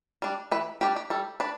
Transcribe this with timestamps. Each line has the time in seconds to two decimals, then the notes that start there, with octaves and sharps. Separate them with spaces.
0.22 G3 D4
0.51 E3 B4
0.81 G3 D4 G4
0.96 G4
1.10 G3 A4
1.40 D4 B4